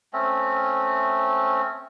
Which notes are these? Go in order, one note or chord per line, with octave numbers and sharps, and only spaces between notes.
A3 C4 C#4